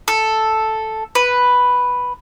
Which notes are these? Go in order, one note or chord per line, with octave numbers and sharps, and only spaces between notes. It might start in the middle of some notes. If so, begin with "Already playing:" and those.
A4
B4